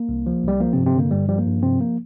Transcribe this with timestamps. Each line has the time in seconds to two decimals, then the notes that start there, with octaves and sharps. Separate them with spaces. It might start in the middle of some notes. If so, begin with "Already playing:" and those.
Already playing: A#3
0.09 C2
0.26 F3
0.44 C2 G3
0.60 F3 A#3
0.73 C3 C4
0.78 G2
0.86 C3 C4
0.95 D3 A#3
1.11 G2 G3
1.29 F3 G3
1.38 A#3
1.46 G2
1.63 C3 F3 C4
1.81 A#3